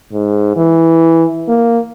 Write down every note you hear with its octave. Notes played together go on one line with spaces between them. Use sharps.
G#2
E3
A#3